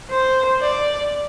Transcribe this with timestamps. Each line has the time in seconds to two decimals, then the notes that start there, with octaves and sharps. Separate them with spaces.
0.11 C5
0.61 D5